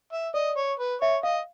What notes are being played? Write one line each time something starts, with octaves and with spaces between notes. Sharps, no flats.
E5
D5 D#5
C#5
B4
C#5 E5
D#5 F5